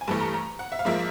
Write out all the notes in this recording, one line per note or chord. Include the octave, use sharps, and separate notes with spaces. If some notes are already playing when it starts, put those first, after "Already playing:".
G#5
G2 E3 A3 A5
A#5
A#5
F#5
E5
F5
G#2 F3 A#3 E5